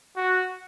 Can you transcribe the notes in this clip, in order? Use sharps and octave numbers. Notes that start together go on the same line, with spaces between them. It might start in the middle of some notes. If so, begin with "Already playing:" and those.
F#4